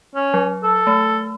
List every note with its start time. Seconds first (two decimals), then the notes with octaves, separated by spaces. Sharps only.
0.15 C#4
0.34 F#3
0.63 A4
0.87 A3